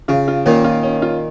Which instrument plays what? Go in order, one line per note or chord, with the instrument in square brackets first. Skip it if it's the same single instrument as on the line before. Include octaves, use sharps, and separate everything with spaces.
[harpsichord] C#3 [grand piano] F4
[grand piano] F4
[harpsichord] A#2 D#3 [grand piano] C#4
[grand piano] F4
C#4
F4